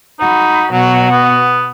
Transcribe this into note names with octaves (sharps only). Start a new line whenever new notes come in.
D#4 F#4 B5
B2 F#3 F#4
B3